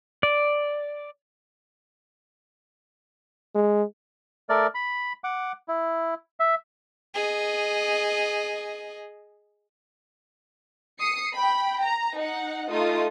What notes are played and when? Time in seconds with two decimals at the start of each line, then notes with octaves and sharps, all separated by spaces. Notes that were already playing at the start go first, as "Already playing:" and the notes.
0.23 D5
3.55 G#3
4.49 A3 A#4 D5
4.75 B5
5.24 F#5 D6
5.68 E4
6.40 E5
7.14 G#4 D#5
10.99 D#6 C7 C#7
11.35 G5 B5
11.83 A#5
12.20 D#4 F#5
12.72 A3 D#4 F4 D#6